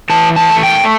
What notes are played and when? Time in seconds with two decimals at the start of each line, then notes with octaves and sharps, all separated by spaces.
0.10 E3 A5
0.36 A5
0.50 A3
0.63 G5